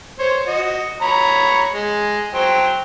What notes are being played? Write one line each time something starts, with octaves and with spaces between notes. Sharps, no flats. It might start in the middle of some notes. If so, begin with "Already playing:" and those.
C5 C#5
F#4 D#5
C#5 A#5 B5
G#3
F#3 C5 G5